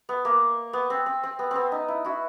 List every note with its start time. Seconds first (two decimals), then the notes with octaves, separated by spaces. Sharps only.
0.09 B3
0.25 A#3
0.73 B3
0.90 C4
1.06 C4
1.23 C4
1.39 B3
1.51 B3 C4
1.72 D#4
1.88 E4
2.05 E4 F#4